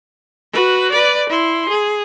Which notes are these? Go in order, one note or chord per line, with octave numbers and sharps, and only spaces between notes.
F#4 B4
B4 D5
E4 C6
G#4